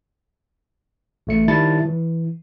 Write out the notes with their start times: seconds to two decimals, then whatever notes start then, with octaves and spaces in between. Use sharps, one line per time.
1.27 A1 A3 C#7
1.48 D#3 G3 E4 A5 B5 A6
1.85 E3